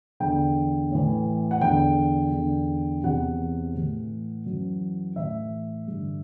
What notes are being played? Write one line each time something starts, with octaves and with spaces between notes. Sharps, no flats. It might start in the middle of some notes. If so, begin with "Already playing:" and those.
E2 D3 G5
A2 E3
F#5
E2 D3 G5
E2 D3
E2 C3 E3 F#5
A2 E3
F#2 E3
A2 E3 E5
G2 D3